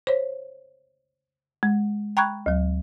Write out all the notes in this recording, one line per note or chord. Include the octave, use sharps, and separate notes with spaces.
C5 C#5
G#3
G5 A#5 B5 C#6 F#6 G#6
D2 F#3